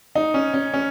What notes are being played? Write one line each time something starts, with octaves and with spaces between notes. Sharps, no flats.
D#4
C#4
C#4
C#4